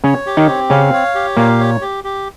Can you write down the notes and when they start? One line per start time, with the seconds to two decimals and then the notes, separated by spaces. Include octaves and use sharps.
0.04 C#3 C#4 C#5
0.26 G4
0.37 D#3 D#4
0.48 C4
0.70 C#3 C#4 F5
0.93 C#5
1.15 G4
1.37 A#2 A#3 F5
1.60 C#5
1.81 G4
2.04 G4